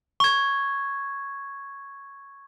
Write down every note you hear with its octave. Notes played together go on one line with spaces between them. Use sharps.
C#6 G#6